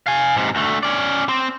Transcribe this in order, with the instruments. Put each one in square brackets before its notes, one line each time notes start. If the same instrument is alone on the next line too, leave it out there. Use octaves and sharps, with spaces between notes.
[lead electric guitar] F5 G#5
G#2 C3
D2 A3
C#4 D5
C4